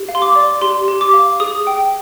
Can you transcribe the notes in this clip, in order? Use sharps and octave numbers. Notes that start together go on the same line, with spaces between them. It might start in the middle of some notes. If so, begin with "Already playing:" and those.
Already playing: G4
F5
C6
D6
D5
G4 C6
G4
D6
F5
G#4 D#6
G5